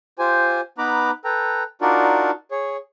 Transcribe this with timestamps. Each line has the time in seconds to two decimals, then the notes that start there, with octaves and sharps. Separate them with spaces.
0.19 F4 G4 C5 G#5
0.78 B3 D#4 B4 A#5 B5 D6
1.24 A4 B4 G5 A#5
1.81 D4 D#4 F4 F#4 A#4 D5
2.51 G#4 C#5